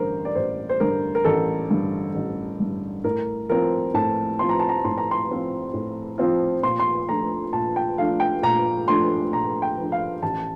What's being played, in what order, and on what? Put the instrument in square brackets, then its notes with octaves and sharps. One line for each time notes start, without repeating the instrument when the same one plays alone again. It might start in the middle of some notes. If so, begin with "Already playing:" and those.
Already playing: [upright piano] A1 G2 D3 A#4 C5
D5
A1 C5
C5
G2 D3 A#4
A#4
A1 A4
G2 D3
A1
G2 D3
A2 A#4
F3 C4 F4 A#4
A2 A5
F3 C4 F4 C6
A#5
A5
A#5
A2 C6
A#5
C6
F3 C4 F4
A2
F3 C4 F4
A#2 C6
C6
F3 A3 D4 A#5
A#2 A5
G5
F3 A3 D4 F5
G5
A#2 A#5
F3 A3 D4 C6
A#2 A#5
G5
F3 A3 D4
F5
A1 A5